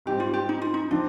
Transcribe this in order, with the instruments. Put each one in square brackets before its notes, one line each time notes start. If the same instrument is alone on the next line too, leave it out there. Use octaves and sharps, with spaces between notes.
[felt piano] G#2 G3 C4 [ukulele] G4
[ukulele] F4
G4
D#4
F4
D#4
[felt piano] F3 C4 [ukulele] D4